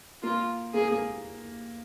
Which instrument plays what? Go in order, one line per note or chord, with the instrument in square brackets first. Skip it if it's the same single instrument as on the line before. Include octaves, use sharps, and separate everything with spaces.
[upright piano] A#3 [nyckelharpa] F4
[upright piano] A#3 [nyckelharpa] G#4
[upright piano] A#3